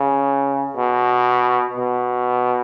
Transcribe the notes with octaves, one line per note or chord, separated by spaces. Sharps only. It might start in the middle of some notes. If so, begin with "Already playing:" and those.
Already playing: C#3
B2
B2